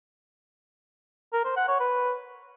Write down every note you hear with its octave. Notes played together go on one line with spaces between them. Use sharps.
A#4
C5
F#5
C#5
B4